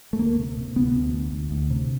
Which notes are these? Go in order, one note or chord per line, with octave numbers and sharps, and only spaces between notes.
A3
D2 A#3
C3
C3
D2 B3
D2
D2
D2
D2
C3